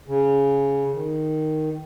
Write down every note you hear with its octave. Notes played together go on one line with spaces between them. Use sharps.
C#3
D#3